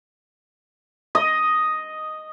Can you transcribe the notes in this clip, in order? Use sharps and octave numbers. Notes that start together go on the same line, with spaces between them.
D#5